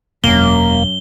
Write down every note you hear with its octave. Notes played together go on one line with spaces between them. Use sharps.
E1 F#2 A#3 G7